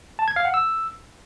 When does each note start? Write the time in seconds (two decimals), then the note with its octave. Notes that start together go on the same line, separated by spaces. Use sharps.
0.19 A5
0.28 G#6
0.36 F5
0.45 F#5
0.54 E6